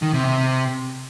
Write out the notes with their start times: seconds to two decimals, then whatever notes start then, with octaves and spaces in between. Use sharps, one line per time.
0.02 D#3
0.13 C3
0.25 C3